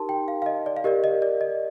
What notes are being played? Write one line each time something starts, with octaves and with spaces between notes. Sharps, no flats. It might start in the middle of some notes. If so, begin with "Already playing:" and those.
Already playing: D#4 G4 A#4 A5 C6
G5
F5
F5
D#5
D5
F5
G4 A#4 D5 D#5
D#5
D5
D#5